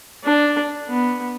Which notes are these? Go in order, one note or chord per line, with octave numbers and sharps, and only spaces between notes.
D4
B3